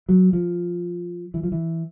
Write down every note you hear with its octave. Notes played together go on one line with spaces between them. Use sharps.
F#3
F3
E3
F3
E3